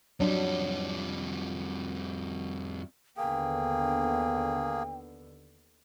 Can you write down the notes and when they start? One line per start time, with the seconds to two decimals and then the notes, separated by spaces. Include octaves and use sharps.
0.20 F2 F#3 G3 D4
3.17 D#2 D3 A#3 B3 G#4 G5